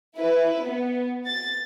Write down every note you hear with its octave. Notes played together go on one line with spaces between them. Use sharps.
E4 B4
B3
A6